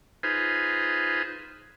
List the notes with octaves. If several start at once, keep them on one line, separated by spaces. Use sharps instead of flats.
D#4 F4 G#4 B4 C5